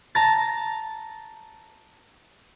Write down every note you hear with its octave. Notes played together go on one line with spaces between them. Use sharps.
A5 A#5 A6